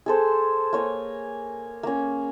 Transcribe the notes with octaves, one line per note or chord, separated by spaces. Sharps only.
G#4 A4 C5
A#3 C#5 G#5
A#3 C#4